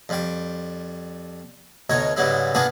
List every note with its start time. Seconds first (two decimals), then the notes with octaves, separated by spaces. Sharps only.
0.09 F2 G3 G5
1.90 D2 B2 D#4 C#5 A#5
2.16 G#2 C#3 F#3 G3 B3 E4
2.55 A#3 B3 D4 F#4 G#4 B4